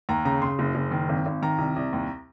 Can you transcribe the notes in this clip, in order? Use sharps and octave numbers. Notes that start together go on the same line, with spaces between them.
D#2 A#5
C#3 A#5
C#3 C6
F#1
F#1
D#3
G#1
G#1
D#3 A#5
C2
C2
D#2